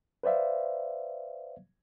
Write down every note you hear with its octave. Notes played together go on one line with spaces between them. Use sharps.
B4 C5 D5 E5 F5